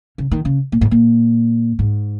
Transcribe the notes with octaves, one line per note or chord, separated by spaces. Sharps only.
C#3
D#3
C#3
A#2
G#2
A#2
G#2